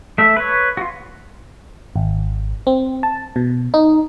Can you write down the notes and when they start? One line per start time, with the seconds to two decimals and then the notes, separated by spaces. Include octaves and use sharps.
0.18 A3 E5
0.36 B4 C#5
0.77 F4 F#4
1.96 G#1
2.67 C4
3.03 A5
3.36 B2
3.74 D#4